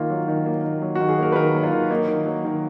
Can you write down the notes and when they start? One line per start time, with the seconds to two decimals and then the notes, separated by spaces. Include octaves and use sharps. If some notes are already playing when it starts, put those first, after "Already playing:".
Already playing: D#3 A#3 F4
0.10 F#3
0.28 D#3
0.46 A#3
0.64 D#3
0.82 F#3
0.95 F#4
1.00 D#3
1.08 G#4
1.18 A#3 A#4
1.32 B4
1.36 D#3 A#4
1.54 F#3
1.63 F4
1.72 D#3
1.90 A#3 D#4
2.08 D#3
2.26 F#3
2.45 D#3